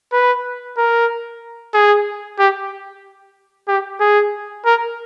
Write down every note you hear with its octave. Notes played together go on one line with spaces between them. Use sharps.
B4
A#4
G#4
G4
G4
G#4
A#4